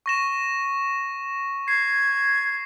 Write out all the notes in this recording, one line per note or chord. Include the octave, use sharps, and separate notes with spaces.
C#6 A#6 E7
G#6 C7